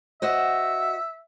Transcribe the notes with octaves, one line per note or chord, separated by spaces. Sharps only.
F#4 C5 D#5 E5